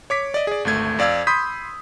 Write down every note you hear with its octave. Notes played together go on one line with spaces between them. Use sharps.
C#5 D6 B6
D5 D#5
G#4 D5
G#1 D2 A3 G#6
F2 D5 F5 E6 G#6
B5 C6 D#6 G6 B6